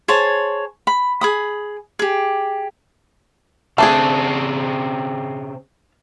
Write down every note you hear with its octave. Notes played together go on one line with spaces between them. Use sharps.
G#4 C5 C#5 A5
B5
G#4 B5 D#6
G4 G#4
C#3 A3 C4 D4 G#4 F5 A5